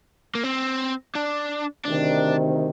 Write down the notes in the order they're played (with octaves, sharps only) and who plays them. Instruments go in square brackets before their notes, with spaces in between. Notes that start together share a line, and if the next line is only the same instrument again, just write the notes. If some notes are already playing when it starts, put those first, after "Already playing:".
[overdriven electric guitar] A#3
C4
D4
[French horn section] D2 C3 D#3 [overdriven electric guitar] D4